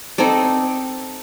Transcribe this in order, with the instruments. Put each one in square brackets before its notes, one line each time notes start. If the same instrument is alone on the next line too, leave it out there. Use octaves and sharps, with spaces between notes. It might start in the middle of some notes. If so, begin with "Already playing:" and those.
[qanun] C4 D#4 A4 D5